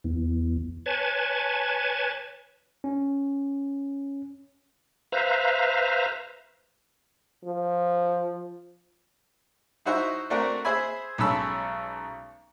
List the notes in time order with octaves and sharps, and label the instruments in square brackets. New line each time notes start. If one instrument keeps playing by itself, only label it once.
[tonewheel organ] E2
B4 C#5 G#5 A5
[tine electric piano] C#4
[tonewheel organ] B4 C5 E5 F5 A#5
[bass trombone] F3
[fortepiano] D#4 E4 F#4 C5 E5
A3 C4 D4 F#4 A#4
G#4 C5 E5 G#5 B5
B1 G#3 C#4 A4 B5 E6